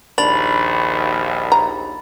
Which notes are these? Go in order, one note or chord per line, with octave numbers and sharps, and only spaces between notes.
A#1 D#2 D4 B5 A6 F#7
A#5